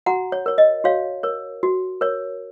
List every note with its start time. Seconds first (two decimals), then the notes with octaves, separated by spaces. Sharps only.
0.06 F#4 F#5 A#5
0.32 C#5
0.46 A#4 C#5
0.58 D#5
0.84 F#4 C#5 F5
1.23 A#4 C#5
1.63 F#4
2.01 A#4 C#5